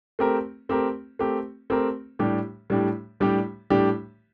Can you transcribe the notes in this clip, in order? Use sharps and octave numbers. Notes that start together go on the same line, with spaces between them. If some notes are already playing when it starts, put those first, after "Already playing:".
A3 C4 G4 A#4
A3 C4 G4 A#4
A3 C4 G4 A#4
A3 C4 G4 A#4
A2 G3 D4 G4
A2 G3 D4 G4
A2 G3 D4 G4
A2 G3 D4 G4